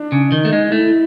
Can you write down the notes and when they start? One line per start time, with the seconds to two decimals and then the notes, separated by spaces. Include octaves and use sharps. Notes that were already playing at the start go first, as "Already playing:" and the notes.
Already playing: D4
0.12 C#3
0.32 D#3 D#4
0.45 A3
0.53 G#3
0.72 A3 E4